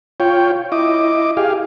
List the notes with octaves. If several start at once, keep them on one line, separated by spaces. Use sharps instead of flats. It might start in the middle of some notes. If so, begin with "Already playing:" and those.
F4 C#5 G5
E4 D#5 D6
G4 G#4 F5